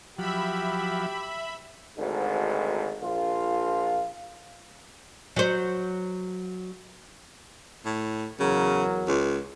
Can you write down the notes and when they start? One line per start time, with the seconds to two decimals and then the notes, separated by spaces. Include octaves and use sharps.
0.19 F3 F#3 G4 E5 B5
1.97 G#1 D2 G#2
3.02 A#1 F4
5.36 F#3 C5
7.85 A2
8.40 E2 C#3 F#3 A#4
9.08 C#2